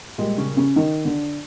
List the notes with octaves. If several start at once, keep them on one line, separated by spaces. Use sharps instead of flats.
A#2 G3 G#3
C#3 C#4
C#3 C#4
D#3 D#4
D3 D4